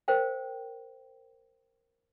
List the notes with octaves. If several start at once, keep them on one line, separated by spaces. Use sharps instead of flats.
A#4 C5 F5 G5